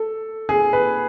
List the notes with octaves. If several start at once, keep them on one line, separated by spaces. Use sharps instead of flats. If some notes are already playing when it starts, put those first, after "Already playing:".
Already playing: A4
G#4
B4